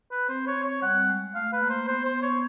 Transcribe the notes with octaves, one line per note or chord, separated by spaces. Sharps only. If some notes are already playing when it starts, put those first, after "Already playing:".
B4
C4 C5
C#5
C4
C#5
G3 F#5
G#3
A3 F5
B4
A#3
C5
B3 C5
C5
B3
C#5